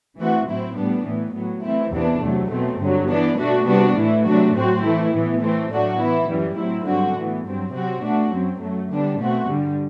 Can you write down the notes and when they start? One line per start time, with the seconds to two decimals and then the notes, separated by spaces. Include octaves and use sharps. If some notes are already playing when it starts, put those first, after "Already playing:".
0.18 E3 A3 C4 F#4
0.48 A2 F#3 C4 E4
0.77 A2 G3 B3 D4
1.05 A2 E3 B3
1.34 A2 F#3 B3
1.63 E3 A3 C4 E4
1.93 E2 C3 E3 B3 D4
2.22 E2 C3 F#3 A3
2.51 B2 F#3 A3 C4
2.80 G2 D3 F#3
3.09 E3 B3 D4
3.38 B2 A3 D4 F#4
3.67 C3 G3 B3 D4 F#4
3.96 A2 E3 A3 E4
4.25 C3 F#3 A3 D4 F#4
4.55 A2 F#3 C4 F#4
4.83 E3 A3 E4
5.13 A2 E3 B3
5.42 E3 A3 C4
5.71 A2 F#3 A3 D4 F#4
6.00 E3 B3 E4
6.29 F#2 E3 G3
6.58 A2 F#3 C4 E4
6.87 G2 D3 F#3 C4 F#4
7.16 A2 E3 B3
7.45 G2 F#3 C4
7.74 C3 F#3 C4 F#4
8.03 B2 A3 D4 F#4
8.33 F#2 F#3 C4
8.62 F#2 F#3 A3
8.91 D3 G3 B3 D4
9.20 B2 A3 C4 F#4
9.49 G2 D3 G3